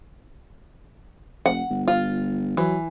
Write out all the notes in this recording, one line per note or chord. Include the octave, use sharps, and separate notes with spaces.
F1 F#5
G1
F4
E3 F#3